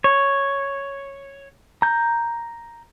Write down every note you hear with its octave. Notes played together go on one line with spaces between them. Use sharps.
C#5
A#5 G6